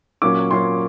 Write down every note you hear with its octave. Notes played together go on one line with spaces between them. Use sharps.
A#2 F#3 A#3 C#4 D6
A#2 F#3 A#3 C#4 C6